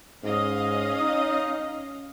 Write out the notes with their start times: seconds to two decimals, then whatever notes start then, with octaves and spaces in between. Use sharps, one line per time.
0.24 G#2 C#4 D#5 F5
1.00 D#4